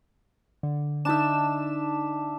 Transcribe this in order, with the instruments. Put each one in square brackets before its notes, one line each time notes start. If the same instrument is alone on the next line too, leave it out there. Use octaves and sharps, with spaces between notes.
[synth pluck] D3
[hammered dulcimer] D4 E5 [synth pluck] D#4 A5 E7